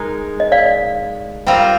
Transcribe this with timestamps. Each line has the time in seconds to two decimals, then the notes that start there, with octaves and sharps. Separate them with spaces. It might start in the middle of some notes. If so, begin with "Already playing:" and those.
Already playing: G#3 D#4 A#4
0.40 D#5
0.52 D5 F5
1.47 G3 C4 F4 A#4